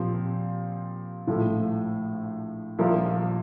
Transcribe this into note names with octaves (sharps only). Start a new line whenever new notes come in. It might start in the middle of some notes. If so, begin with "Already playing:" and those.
Already playing: A#2 F3 C4 G4
A#1 A2 F3 A3
A#1 A#2 F3 A#3 E4